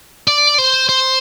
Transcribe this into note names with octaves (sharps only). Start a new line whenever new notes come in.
D5
C5
C5